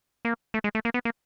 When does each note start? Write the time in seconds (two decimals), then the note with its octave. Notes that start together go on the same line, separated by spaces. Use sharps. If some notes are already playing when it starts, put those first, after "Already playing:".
0.25 A#3
0.54 A3
0.64 G#3
0.75 A3
0.85 A#3
0.94 B3
1.05 A#3